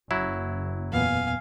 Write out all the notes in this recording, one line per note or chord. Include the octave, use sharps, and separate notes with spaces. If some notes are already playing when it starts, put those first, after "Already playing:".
F#1 F#3 E4
E2 A#2 B3 F5 G#5